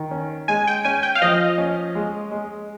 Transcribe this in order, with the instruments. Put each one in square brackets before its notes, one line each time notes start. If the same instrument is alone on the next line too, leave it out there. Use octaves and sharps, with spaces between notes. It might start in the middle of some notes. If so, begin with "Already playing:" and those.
Already playing: [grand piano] D#3
C#4
[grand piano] G#3 [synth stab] G#5
[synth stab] G5
[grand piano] C#4 [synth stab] G#5
[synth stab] G5
F5
[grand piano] F3 [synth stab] D#5
[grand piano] C#4
G#3
G#3